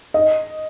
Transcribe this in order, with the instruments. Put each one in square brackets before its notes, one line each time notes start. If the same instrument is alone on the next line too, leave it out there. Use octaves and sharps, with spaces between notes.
[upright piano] D#5